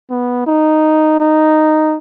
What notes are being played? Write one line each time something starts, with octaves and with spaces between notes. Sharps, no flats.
B3
D#4
D#4